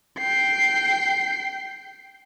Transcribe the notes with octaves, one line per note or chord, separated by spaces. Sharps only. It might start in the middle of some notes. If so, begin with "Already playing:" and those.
G5 C7